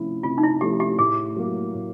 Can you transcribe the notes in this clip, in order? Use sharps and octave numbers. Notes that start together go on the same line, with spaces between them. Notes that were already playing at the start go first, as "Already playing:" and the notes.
Already playing: C3 F3 A3 C#4 E4
C3 F4
D#4
E4
F3 A3 C#4 E4 G4
G4
A2 G#4
F#3 A#3
A2